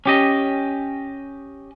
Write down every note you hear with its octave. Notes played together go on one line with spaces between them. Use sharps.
C#4 G4 D#5